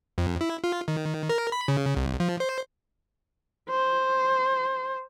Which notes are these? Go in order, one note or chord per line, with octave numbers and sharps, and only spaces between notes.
F2
E4
F4
D#3
A#4
B5
C#3
C2
F3
C5
C5